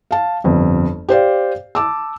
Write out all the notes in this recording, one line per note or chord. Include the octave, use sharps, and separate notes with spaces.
F5 A5
G1 F2
G4 C5 D5 F5
A5 D6 E6